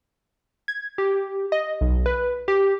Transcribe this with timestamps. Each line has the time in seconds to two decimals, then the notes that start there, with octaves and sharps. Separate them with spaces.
0.68 G#6
0.98 G4
1.52 D#5
1.81 B1
2.06 B4
2.48 G4